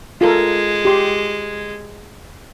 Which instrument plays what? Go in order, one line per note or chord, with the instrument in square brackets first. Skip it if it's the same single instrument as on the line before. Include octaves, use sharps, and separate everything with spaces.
[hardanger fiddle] G#3 [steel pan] F4 A4 A#4
[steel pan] G4 C6